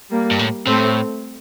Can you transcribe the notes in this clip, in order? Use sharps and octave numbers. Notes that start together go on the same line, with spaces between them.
G3 A#3
G2
A2
A2 A3 C4